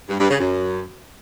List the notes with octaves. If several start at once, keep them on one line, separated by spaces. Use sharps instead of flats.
G2
G2
C#3
F#2